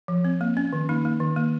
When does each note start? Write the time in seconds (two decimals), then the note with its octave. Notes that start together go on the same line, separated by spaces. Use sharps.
0.08 F3
0.24 C4
0.41 A#3
0.57 C#4
0.73 D#3
0.89 A#3 D#4
1.05 A#3
1.20 D#3
1.36 A#3